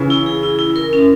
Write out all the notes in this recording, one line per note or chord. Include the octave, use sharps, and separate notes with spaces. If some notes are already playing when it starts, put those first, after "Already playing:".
Already playing: C#3 E3
E4
G#4
E4
E4
A#4
C#4